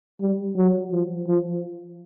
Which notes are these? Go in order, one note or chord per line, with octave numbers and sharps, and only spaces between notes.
G3
F#3
F3
F3